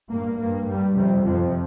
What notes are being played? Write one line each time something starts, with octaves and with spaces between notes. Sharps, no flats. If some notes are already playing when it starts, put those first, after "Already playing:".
G2 A#3
G2 A#3
G2 G3
F2 C3 G3
F2 C3 F3